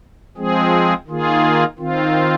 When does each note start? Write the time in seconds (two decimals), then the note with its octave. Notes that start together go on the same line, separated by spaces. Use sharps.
0.37 F3 G#3 C4 G#4
1.07 D#3 A#3 F4 G#4
1.79 D#3 C4 F4